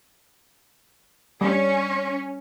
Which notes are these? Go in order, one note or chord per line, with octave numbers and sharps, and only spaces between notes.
G3 C#4